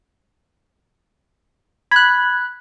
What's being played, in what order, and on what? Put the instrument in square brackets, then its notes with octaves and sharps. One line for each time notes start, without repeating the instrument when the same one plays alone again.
[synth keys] B5 F#6 [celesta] G#6